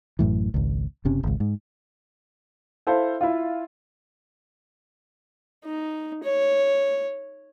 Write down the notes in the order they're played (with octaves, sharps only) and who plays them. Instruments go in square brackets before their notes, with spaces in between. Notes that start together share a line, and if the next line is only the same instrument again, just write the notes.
[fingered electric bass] A1 F#2 A2 E3
G#1 C#2
F#1 C3 C#4
G#1 C#2
G#2
[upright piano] E4 A4 C5 F5
E4 F4
[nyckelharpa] D#4
C#5